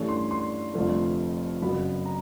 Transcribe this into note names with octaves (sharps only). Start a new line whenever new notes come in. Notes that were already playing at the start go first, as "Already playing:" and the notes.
Already playing: G2 E3 A3 C#4
C6
C6
F1 F2 D3 F3 A3
F#1 F#2 C#3 F#3 B3 B5
A#5